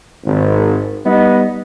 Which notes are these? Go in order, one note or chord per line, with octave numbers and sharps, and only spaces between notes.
G#1
G3 B3 D#4 D#5